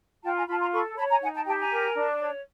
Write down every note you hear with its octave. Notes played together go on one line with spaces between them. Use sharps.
F4 G5 A5
G#5 A#5
F4 A5 B5
A#5 C6
A4 B5 C#6
C#5 A5 B5
G#5 A#5
D#4 F#5 G#5
G5 A5
G4 G5 A5
G#5 A#5
A#4
D4
C#5